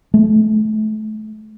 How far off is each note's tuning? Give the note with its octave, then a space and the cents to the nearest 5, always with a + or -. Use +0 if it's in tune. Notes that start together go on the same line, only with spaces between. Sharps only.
A3 -30